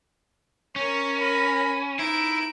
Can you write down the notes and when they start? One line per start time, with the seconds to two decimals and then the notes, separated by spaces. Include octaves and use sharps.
0.76 C#4 A#4 C#5
1.20 A#4 B5
1.99 D#4 E4 D7